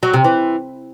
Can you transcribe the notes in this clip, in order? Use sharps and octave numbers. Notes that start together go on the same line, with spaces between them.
F#3
C3
E3